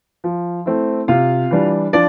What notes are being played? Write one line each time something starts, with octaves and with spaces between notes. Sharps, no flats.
F3
A3 C4 E4
C3 F4 F5
E3 G3 D4
F3 D4 D5